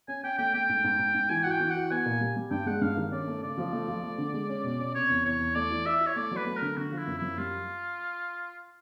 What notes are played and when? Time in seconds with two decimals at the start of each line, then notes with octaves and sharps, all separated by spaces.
0.08 C#4 G#5
0.23 C#4 G5
0.38 A3 G5
0.54 A3 G5
0.69 G#2
0.84 G#2
0.99 G#2
1.14 G#2
1.30 E3 G#5
1.44 F#4 F#5
1.51 G5
1.60 E3
1.70 F#4 F#5
1.90 B3 G#5
2.06 A#2
2.21 G3
2.36 G3
2.51 G2 G5
2.66 G#3 F#5
2.81 G2 F5
2.97 D#3
3.12 C#4 D5
3.27 A3
3.42 C#3 D5
3.58 F3
3.73 A3
3.88 F3
4.03 A3
4.18 D3
4.34 G#3
4.49 C#4
4.64 B2
4.79 C#4
4.94 C3 C#5
5.09 E2
5.25 E2 C#5
5.40 E2
5.55 A3 D5
5.71 E3
5.86 E4 E5
6.01 E4
6.06 C#5
6.16 A3 D5
6.31 F#3 B4
6.46 A3
6.57 D3 A#4
6.77 D3 F#4
6.92 F3
6.97 E4
7.07 F#2
7.18 F#2 E4
7.38 G3 F4